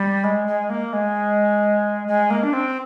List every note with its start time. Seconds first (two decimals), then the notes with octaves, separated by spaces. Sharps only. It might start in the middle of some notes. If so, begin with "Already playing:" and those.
Already playing: G3
0.24 G#3
0.47 G#3
0.70 A#3
0.93 G#3
2.08 G#3
2.30 A#3
2.43 D4
2.53 C4